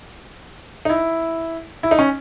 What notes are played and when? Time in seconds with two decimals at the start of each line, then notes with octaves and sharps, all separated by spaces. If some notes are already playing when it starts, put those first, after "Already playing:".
0.85 D#4
0.90 E4
1.83 E4
1.91 D#4
1.99 C#4